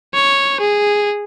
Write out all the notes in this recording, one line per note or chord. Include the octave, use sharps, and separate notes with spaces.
C#5
G#4